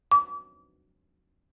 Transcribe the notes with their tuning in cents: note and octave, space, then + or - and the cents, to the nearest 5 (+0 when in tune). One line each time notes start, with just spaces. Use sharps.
D6 -30